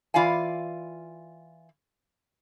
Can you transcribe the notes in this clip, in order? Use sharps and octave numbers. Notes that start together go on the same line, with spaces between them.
E3 F4 D5 F5 G#5